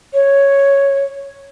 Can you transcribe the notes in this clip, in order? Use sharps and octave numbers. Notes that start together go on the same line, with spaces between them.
C#5